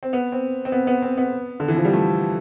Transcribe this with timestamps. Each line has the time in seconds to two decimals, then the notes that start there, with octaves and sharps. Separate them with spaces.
0.03 C4
0.13 B3
0.32 C4
0.65 C4
0.72 B3
0.87 B3
1.02 C4
1.18 B3
1.60 D3
1.68 E3
1.76 F3
1.85 G3
1.93 A3